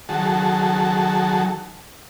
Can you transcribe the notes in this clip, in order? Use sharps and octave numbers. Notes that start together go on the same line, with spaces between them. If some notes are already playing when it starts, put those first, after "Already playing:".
D#3 F#3 F#4 G#4 A4 A5